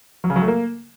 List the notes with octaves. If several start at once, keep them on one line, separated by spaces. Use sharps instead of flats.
F#3
C#3
F#3
A3
A#3